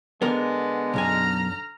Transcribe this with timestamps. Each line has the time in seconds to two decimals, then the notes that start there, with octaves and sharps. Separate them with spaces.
0.22 D3 G#3 B3 A#4
0.94 B1 F#2 G#5 A#5 F6